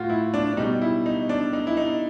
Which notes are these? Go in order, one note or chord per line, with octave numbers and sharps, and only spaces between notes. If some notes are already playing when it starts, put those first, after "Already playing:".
Already playing: A2 F4 F#4
E4
D4
D4
B2 G3 D#4
E4
D#4
D4
D#4
E4
D#4